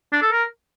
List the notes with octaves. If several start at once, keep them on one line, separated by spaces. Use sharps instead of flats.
D4
A4
A#4